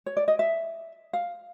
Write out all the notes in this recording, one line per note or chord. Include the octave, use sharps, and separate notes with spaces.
C#5
D5
D#5
E5
F5